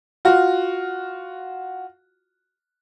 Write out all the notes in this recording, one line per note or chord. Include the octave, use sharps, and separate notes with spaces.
F4 F#4